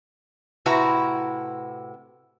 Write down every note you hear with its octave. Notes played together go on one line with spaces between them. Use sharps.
A2 C3 E4 F#4 B4 A#5